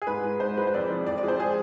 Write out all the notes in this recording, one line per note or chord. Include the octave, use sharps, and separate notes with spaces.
G#4
G#2 B4
G#3
G#2 C5
G#3 B4
C5
F2 D5
F3
F2 D5
D5
G#3
C5
G#4